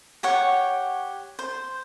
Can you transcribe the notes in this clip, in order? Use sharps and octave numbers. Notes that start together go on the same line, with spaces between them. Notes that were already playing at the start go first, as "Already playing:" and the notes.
G4 C#5 F#5
C5